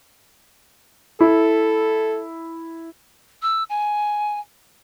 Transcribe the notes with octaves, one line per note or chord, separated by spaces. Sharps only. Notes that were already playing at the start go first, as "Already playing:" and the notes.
E4 A4
E6
G#5